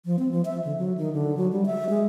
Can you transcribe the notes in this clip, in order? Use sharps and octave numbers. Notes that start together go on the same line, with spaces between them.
F3
C4
F3
E5
D3
F#3
D#3
D3
F#3
G3
E5
G#3